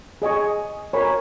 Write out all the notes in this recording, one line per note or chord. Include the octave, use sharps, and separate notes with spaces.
G#4 D#5 G#5 C#6
A#4 C#5 G#5 B5